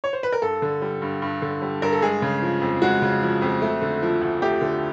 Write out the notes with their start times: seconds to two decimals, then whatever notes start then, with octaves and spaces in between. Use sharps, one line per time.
0.04 C#5
0.13 C5
0.23 B4
0.32 A#4
0.42 G2 A4
0.62 D3
0.82 G3
1.02 G2
1.22 G2
1.42 D3
1.62 G3
1.82 G2 A#4
1.92 A4
2.02 G#3 G#4
2.22 C#3
2.42 F3
2.62 F2
2.82 G#3 F#4
3.02 C#3
3.23 F3
3.42 F2
3.62 A3
3.82 D3
4.03 F3
4.21 D2
4.42 A3 G4
4.62 D3